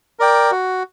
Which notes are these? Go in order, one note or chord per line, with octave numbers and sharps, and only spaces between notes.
A#4 D5 G5
F#4